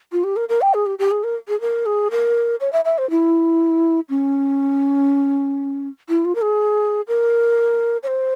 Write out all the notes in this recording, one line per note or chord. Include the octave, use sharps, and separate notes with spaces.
F4
G4
A#4
A#4
G5
G#4
G4
G4
G#4
A#4
G#4
A#4
G#4
A#4
C#5
E5
E5
C5
E4
C#4
E4
F4
A#4
G#4
A#4
C#5
C5